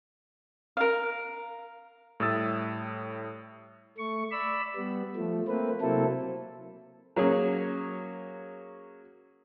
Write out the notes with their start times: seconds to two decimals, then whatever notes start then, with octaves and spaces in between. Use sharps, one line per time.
0.77 A#4 F5
2.20 A2 G3 E5 D#6 E6 A6
3.98 A3 C#6
4.32 D5 B5 E6
4.76 G3 B3
5.16 F3 A3
5.48 A3 A#3 C4 B4
5.81 C3 F#3 A#3 C4 E4 A4
7.16 F#3 A#3 C#4 G#4